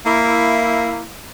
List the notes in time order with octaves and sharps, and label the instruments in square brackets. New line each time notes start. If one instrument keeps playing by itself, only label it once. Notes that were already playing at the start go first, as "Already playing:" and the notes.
[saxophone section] A#3 E4